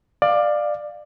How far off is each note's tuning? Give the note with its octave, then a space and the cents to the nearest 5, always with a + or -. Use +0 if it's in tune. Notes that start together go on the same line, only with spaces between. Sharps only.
D5 +20 F5 +0